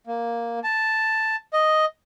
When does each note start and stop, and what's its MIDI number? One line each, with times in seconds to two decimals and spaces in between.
0.07 0.59 58
0.64 1.36 81
1.53 1.85 75